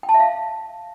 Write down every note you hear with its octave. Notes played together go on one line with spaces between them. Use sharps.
G5
A5
E5
F5